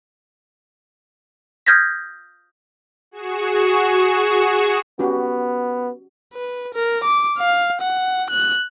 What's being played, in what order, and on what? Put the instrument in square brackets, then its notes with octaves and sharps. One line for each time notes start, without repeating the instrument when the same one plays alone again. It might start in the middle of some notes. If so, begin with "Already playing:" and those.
[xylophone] D#6 F6 G6 G#6 A#6 B6
[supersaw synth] F#4 G#4 C#6 E7
[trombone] B3 [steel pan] C#4 F#4 G4
[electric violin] B4
A#4
D6
F5
F#5
F#6